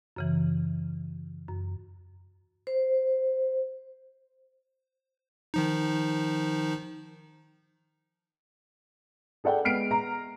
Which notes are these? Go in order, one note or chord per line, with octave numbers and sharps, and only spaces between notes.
F#2 C#3 E3
F#2
C5
D#3 F3 D#4
G#4 A4 D5 F#5 G5
G#3 B3 F6 C7 D7
A#5